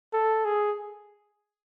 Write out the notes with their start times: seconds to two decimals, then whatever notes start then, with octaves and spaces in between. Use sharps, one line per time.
0.13 A4
0.45 G#4